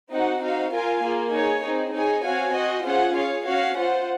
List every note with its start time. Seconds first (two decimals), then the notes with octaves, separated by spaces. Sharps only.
0.12 C4 D#4 F#4 C5 F#5
0.43 D#4 F#4 C5 F5
0.73 F4 A#4 F5 G#5
1.03 A#3 F4 G#4
1.34 D#4 G#4 C#5 G#5
1.64 C4 D#4 G#4
1.94 D#4 G#4 C#5 G#5
2.25 C4 F#4 C#5 F5 G#5
2.55 F#4 C5 D#5
2.85 C#4 F4 G#4 C5 F#5
3.16 G#4 C#5 F5
3.46 C#4 F#4 C#5 F5
3.77 F4 C5 F#5